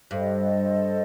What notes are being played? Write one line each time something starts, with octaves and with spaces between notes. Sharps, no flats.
G2 A4 C5 D#5